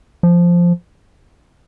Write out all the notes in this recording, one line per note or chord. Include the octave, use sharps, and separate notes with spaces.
F3